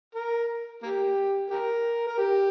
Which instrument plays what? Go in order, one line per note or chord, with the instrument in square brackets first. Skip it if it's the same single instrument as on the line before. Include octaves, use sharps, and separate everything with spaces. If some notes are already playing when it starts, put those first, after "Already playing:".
[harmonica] A#4
A#3 G4
G4 A#4
A#4
G4